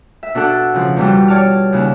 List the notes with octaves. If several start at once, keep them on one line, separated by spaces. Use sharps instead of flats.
E5
B2 D4 A4 F#5
C#3 F3
E2 B2 G3
C#5 D5 A5 F6
D#2 C#3